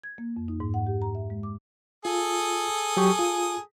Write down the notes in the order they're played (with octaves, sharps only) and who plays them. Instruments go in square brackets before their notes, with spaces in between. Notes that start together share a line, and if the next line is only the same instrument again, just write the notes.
[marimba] G#6
A#3
F2
D#4
G#2
F#5
G4
A#5
E5
G#3
D6
[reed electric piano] F4 [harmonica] G#4 A4 D#6
[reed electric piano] F#3 G4 C#6
F4